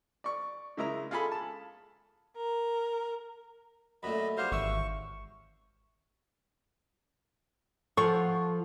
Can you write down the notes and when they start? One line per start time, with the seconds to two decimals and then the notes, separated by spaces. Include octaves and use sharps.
0.24 D5 C#6
0.77 C#3 G#3 E4 A#4 D#5 A#5
1.11 F4 G#4 A4 G#5 B5
1.32 A5
2.37 A#4
4.03 F#2 A#2 A3 D#5 B5
4.37 F#3 G3 D4 C5 F5
4.52 G#1 E3 E5 C#6
7.97 F3 F4 A4 F#5 C#6